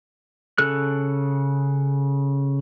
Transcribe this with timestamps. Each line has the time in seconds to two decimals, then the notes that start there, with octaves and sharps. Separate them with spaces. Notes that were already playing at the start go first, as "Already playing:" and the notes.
0.58 C#3 A4 F#6